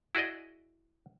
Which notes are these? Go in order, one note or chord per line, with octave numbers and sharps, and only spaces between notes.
E4 F#4 G#4 D5 D#5